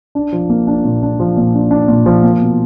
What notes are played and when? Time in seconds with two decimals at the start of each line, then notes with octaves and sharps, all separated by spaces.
0.15 D4
0.33 F3
0.49 A#3
0.67 D4
0.84 A#2
1.03 D4
1.20 F3
1.37 A#2
1.55 D4
1.71 D4
1.88 A#2
2.06 F3
2.23 A#3
2.41 B2